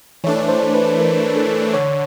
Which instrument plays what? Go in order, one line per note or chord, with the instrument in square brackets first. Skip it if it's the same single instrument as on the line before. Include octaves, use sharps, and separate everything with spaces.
[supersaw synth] E3 A3 D4 [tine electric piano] C#5
[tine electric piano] C5
B4
A#4
A4
[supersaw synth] D3 [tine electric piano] C#5